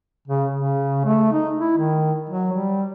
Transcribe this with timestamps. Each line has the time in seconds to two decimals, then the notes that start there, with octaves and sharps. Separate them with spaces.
0.28 C#3
0.55 C#3
1.05 A3
1.32 D#4
1.59 E4
1.78 D#3
2.30 F#3
2.52 G3